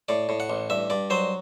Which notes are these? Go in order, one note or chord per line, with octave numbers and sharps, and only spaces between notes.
A2 D5
A2
F#5
A1
G2 E5
G2 D5
F#3 C5